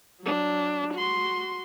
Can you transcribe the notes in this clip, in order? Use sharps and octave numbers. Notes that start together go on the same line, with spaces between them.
F#3 D4
F#4 C6